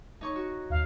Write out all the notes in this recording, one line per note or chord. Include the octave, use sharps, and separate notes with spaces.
D#4 C#5 C#6
F#4
D#2 F5